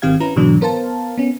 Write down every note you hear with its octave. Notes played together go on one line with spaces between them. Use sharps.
G#1 D#3 C4 G4 F5 G#6
C#4 E4 B4 A#5
G#2 B2 D3 E3 F#3 D4
B3 A#4 C5 F5 A5
B3 C#4